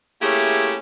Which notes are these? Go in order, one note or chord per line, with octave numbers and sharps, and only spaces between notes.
A3 A#3 C#4 E4 G4 G#4